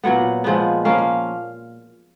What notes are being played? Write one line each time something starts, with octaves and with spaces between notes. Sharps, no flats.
A#2 F#3 B3 F#5
A#2 F3 G#3 B3
F3 A#3 C#4 F5
F5